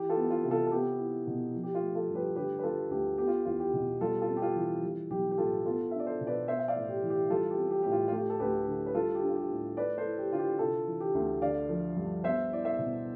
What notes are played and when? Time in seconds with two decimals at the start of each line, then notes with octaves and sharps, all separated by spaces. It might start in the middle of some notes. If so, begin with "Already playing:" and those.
Already playing: E3 G4
0.09 F4 A4
0.16 B3
0.31 F4
0.44 C3
0.51 F4 A4
0.67 A4
0.71 B3 G4
0.99 E4
1.27 B2
1.54 F3
1.63 G4
1.75 F4
1.82 A3
1.95 F4 A4
2.09 G2
2.15 G4 B4
2.36 D3 G4 B4
2.59 B4
2.63 G3 F4 A4
2.91 D2 G4
3.18 B3 G4
3.28 F4
3.46 E2 F4
3.60 G4
3.74 B2
4.01 G3 F4 A4
4.22 F4 A4
4.28 C4
4.37 G4
4.42 F4
4.56 E3
4.83 G3
5.10 B1 G4
5.31 G4
5.38 A2 F4 A4
5.65 B3 F4 A4
5.91 D4 E5
5.99 D5
6.07 A4 C5
6.21 B2
6.27 B4 D5
6.47 B3 C5 E5
6.59 E5
6.68 D5 F5
6.76 A2
6.89 G4
7.03 E3
7.10 G4
7.30 G3 F4 A4
7.50 G4
7.58 C4
7.71 G4
7.83 A2 G4
7.92 F4
8.08 F4
8.12 A3 G4
8.30 A4
8.40 D2 G4 B4
8.67 D3
8.86 B4
8.95 G3 F4 A4
9.15 G4
9.22 D4
9.29 F4
9.36 G4
9.50 A2
9.77 A3 B4 D5
9.98 A4 C5
10.05 E4
10.18 G4
10.32 D3 F4
10.39 G4
10.59 C3 F4 A4
10.87 E3
11.00 G4
11.14 D2
11.42 D3 D5 F5
11.69 F3
11.96 G2
12.24 B3 C5 E5
12.51 E4 D5
12.65 C5 E5
12.79 B2